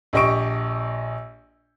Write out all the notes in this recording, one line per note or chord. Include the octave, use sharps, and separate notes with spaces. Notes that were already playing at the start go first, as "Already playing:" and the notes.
A#1 G4 D#5 C#6 D7